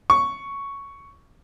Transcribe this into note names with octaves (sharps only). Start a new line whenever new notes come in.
C#6